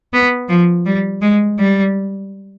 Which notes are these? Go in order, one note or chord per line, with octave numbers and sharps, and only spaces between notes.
B3
F3
G3
G#3
G3